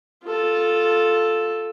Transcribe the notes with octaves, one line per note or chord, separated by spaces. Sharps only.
F4 A4